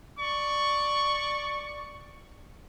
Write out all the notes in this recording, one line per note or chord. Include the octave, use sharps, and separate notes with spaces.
D5 C#6